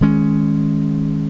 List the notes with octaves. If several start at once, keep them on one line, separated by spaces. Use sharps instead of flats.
D#3 G#3 C#4